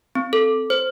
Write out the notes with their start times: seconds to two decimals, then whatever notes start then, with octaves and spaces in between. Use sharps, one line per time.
0.15 C4
0.33 A4
0.70 C5